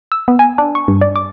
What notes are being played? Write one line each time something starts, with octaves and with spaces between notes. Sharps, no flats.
E6
B3
G#5
D4
C#6
G2
D5
D6